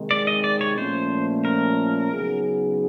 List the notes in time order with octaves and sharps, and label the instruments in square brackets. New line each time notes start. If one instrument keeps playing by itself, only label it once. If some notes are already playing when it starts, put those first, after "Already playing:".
Already playing: [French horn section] C3 D#3 G#3
[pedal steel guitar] D5
D#5
D5
C#5
[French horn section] A#2 F3 A3 C#4 [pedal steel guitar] C5
[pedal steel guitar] A#4
[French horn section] C#3 F#3 B3 D#4 G#4